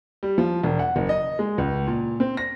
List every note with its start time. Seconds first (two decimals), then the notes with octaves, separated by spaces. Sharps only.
0.23 G3
0.38 F3
0.63 E1
0.79 F#5
0.96 F#1
1.09 D#5
1.39 G#3
1.58 C#2
1.87 A#2
2.20 C4
2.37 A#6